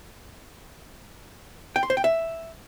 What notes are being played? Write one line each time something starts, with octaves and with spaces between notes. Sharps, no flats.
G5
C6
C5
G5
E5